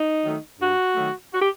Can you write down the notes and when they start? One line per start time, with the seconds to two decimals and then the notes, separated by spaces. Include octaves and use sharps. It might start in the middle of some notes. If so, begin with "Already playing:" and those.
Already playing: D#4
0.23 D#3 F#3 A3
0.59 G2 F#4
0.95 D#3 F#3 A3
1.33 F#4
1.40 G4